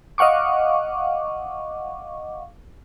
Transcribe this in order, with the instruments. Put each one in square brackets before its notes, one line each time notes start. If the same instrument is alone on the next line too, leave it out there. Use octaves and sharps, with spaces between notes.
[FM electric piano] D#5 F5 F#5 C#6 D6